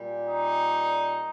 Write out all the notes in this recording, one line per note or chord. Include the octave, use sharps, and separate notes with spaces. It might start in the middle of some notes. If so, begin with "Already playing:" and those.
Already playing: A#2 G3
D#4